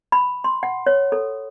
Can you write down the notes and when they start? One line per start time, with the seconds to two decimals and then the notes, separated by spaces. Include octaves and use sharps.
0.12 B5
0.44 C6
0.63 F#5
0.86 C#5
1.12 A4